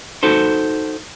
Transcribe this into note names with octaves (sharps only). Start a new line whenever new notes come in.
D#4 F#4 A4 C5